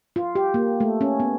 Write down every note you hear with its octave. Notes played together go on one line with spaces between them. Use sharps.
F4
G4
A#3
A3
C#4
B3